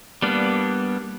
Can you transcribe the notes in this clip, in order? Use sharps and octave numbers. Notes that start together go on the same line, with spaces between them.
G3 A#3 B3 D4